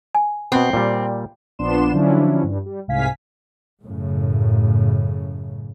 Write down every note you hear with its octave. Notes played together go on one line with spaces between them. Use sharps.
G#5
B2 B3 C4
A#2 G3
A#1 F3 B3 D4 C6 E7
D3 F3 F#3 C#4 D4 E4
G2 G3
G3
C2 G#2 C3 F5 G#5 B6
F#2 A2 C#3